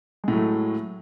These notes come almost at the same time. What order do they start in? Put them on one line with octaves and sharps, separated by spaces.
G#3 A2 F#3 A3